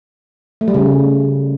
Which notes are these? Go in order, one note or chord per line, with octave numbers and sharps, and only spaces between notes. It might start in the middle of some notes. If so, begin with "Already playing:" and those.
A3
G3
C#3